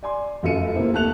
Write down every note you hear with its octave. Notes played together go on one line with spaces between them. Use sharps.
D5 G#5 C6
F1 F#2 F4 A4 C#7 D#7
C3 A#3 C4 E4
D#2 A3 A5 F#6 F7